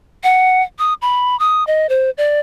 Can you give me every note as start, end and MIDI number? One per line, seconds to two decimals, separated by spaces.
0.24 0.63 78
0.79 0.94 87
1.02 1.38 83
1.40 1.66 87
1.67 1.87 75
1.89 2.10 72
2.18 2.40 74